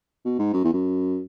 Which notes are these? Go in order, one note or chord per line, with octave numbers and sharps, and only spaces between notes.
B2
G#2
F#2
E2
F#2